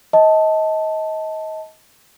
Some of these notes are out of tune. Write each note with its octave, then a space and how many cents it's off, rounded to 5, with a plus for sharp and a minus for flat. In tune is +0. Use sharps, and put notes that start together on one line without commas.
D#5 +25 A5 +0